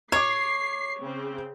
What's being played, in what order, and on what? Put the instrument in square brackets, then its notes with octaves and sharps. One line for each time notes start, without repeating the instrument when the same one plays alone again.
[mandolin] C#5 [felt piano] D6 G#6 [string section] C7
[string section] C#3 C4